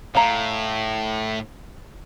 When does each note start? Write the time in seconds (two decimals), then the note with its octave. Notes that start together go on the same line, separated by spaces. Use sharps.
0.15 A2 F5 A#5